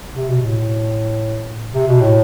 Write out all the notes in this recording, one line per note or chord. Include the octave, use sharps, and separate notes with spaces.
C3
B2
A2
C3
B2
A2